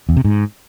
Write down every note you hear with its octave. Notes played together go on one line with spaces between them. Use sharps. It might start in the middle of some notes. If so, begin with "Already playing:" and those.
E2
C3
G#2